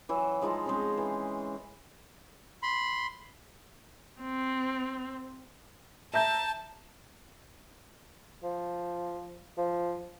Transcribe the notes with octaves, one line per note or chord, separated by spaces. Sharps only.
E3 F#3
F3 G#3 D#4 F4
G#3 C4 C#4
E3
B5 C6
C4
E5 A5 A#5 G6
F3
F3